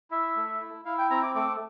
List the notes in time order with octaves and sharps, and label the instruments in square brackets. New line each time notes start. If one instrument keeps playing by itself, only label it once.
[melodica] E4 E5
A3
E4
E4 F5
G5
C4 A#5
D6
A3 D6